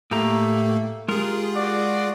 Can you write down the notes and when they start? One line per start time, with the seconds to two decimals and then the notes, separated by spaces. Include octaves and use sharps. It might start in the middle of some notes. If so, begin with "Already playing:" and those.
0.11 A2 A3 A#3 G4 A#5
1.08 G#3 F4 G4 G#4 A#4
1.53 F#4 D5